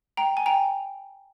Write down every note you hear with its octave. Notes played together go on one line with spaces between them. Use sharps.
G5 A#5
G#5
G5 A#5